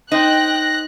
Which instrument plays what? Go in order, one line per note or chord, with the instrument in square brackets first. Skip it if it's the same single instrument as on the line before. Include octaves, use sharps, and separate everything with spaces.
[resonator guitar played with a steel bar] D#4 C5 [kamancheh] G5 [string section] F#6 [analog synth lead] A#6